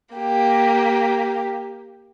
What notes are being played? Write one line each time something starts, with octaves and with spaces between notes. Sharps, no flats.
A#3 G4